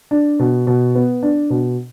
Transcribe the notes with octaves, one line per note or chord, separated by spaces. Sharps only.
D4
B2
B2
B3
D4
B2